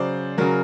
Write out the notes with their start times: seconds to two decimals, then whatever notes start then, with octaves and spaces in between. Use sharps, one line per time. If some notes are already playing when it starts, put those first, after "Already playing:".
Already playing: C#3 F#3 C5 D5
0.38 C#3 F#3 A#4